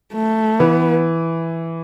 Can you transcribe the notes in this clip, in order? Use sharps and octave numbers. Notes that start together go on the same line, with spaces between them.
A3
E3 B3